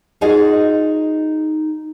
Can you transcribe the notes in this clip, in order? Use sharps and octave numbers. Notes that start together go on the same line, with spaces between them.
D#4 F4 F#4 G#4 D#5